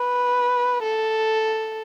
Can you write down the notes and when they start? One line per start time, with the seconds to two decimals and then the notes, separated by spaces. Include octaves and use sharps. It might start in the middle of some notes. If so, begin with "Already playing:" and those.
Already playing: B4
0.82 A4